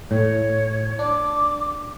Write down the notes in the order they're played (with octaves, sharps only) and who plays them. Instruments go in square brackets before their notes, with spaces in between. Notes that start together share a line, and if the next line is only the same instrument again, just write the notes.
[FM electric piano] A2 [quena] C#5
[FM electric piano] D4 [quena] D6